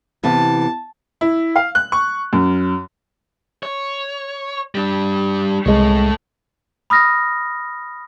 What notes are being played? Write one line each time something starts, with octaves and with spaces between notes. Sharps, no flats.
C3 E3 B3 A5
E4
F5
F#6
C#6
F#2
C#5
G3 D4
C2 G#3 A3 C#5
B5 D#6 F6 A#6